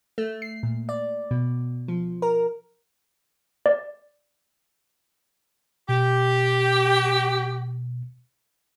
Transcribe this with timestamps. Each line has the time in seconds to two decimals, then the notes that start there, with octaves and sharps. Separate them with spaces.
0.18 A3
0.42 C7
0.63 A#2
0.89 D5
1.31 B2
1.88 F3
2.22 A#4
3.66 D5
5.89 B2 G4